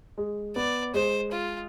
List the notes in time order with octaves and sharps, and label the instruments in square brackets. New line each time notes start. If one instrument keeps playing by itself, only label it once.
[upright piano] G#3
[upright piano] B3 [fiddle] D5
[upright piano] G#3 [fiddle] C5
[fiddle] F4